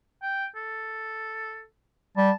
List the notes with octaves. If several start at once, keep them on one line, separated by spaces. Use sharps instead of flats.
G5
A4
G3 A5